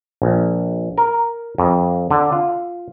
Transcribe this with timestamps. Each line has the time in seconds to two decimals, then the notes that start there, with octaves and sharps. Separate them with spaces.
0.22 A#1
0.98 A#4
1.58 F2
2.11 D3
2.32 F4